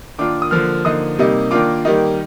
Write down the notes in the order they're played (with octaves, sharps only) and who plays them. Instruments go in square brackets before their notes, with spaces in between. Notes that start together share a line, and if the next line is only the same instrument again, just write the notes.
[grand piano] D#3 A#3 D4 F4 D6
D#6
D3 F3 A#3 F6
D3 F3 A#3 D#4 D#6
C3 G3 A#3 D#4
D#3 A#3 D4 F4 D6
D#3 G3 A#3 D#4